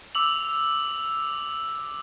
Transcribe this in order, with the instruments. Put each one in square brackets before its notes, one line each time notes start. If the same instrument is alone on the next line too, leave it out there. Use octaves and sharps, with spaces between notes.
[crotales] D6 E6 F7 F#7